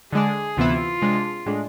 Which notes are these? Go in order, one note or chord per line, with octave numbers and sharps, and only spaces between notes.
D3 G#3 D4 G#4
D2 C3 E3 B3 E4 F4
C3 G#3 D4
A2 G#3 D4